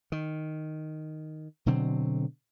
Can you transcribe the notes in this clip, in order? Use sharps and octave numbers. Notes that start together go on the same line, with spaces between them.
D#3
B2 D3 F#3 C4